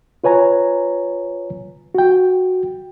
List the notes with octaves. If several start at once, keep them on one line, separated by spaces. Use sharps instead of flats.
F4 B4 C#5 G#5 A#5
F#4 G5